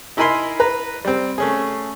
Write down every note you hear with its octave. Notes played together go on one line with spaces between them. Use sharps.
D#4 E4 A#4 G#5 B5 C6
B4 A#5
G3 C4
A3 C#4 G#4